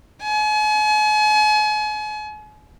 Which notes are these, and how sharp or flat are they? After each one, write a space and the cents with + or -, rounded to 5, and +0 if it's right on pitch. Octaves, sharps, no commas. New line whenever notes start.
G#5 +40